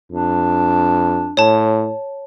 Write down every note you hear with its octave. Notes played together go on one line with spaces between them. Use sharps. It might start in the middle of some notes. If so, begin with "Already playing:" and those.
F2 D4
A2 C#5 A5